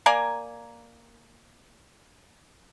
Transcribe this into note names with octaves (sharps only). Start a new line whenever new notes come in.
A#3 A#4 D5 G#5